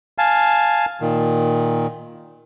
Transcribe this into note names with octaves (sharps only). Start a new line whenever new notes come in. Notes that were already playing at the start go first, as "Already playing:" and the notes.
F5 G#5 A5
A#2 D#3